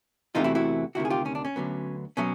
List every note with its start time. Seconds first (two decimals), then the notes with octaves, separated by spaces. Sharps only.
0.35 E2 C3 E3 A3 C4 D#4 F4
0.44 E4 F#4
0.55 E4 F#4
0.95 D2 C3 D#3 E4 F#4
1.05 G#4
1.10 F4 G4
1.26 C#4
1.35 D4
1.45 C#4
1.56 D2 D3 F#3 B3
2.17 B2 F#3 A3 C#4